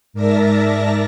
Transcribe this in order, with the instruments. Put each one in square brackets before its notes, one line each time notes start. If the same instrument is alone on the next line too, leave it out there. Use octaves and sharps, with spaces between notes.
[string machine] G#2 A#4 D5 E5 A5 A#6